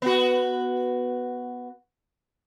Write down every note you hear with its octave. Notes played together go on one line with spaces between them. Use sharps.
B3 F#4